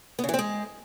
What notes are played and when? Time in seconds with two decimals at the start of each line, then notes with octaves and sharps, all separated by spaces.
0.19 B3
0.24 C#3
0.29 E3
0.34 C4
0.39 G#3